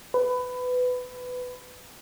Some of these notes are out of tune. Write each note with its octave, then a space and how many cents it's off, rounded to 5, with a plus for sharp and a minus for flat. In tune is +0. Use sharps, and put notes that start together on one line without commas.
B4 +20